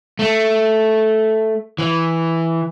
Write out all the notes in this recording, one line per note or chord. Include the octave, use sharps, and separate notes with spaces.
A3
E3